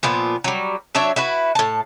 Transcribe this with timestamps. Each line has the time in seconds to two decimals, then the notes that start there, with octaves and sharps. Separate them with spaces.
0.03 A#2 F3 B3
0.44 F#3 G3
0.95 F#3 D4 C#5 E5
1.16 E4 F#4 B4
1.55 A2 A5